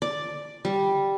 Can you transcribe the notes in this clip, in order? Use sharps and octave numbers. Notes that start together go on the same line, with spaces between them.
D5
G3